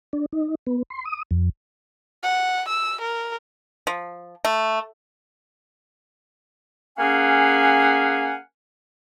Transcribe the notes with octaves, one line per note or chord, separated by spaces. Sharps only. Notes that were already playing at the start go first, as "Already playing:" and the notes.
D4
D#4
B3
C6
D#6
F2
F#5
E6
A#4
F3
A3
A#3 C#4 G#4 F5 F#5 G#5